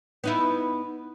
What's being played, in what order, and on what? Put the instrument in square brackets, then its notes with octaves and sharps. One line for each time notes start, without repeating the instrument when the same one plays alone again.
[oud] B3 D#4 E4